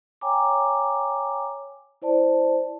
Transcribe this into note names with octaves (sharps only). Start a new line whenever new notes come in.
C#5 G5 G#5 A#5 D6
E4 C5 D5 A5